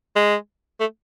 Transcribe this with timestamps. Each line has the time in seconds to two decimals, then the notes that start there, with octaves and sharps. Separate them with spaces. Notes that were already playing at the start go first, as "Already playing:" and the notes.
0.16 G#3
0.80 A3